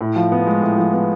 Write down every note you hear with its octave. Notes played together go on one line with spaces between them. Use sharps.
A2
F3
B3
G#3
A2
F3
B3